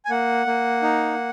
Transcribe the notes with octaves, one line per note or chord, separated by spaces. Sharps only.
G#5
A#3 F#5
A#3
D#4